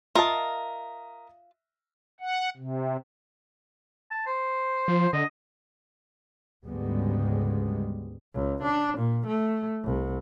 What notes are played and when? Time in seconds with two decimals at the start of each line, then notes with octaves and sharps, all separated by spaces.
0.15 F4 A#4 D#5 E5 A5 D#6
2.20 F#5
2.57 C3
4.11 A5
4.26 C5
4.88 F3
5.13 D3 D#5
6.66 D2 G#2 C#3 G3 G#3 B3
8.35 C#2
8.63 D4
8.98 A#2
9.27 A3
9.84 C2